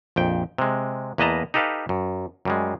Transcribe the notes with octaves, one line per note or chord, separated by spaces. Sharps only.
A#1 F2 G5
C3 G#3
E2 A#3 B4 D#5 A5 A#5
D#4 G4 A4 B4 F5
F#2
F#2 G3 G#3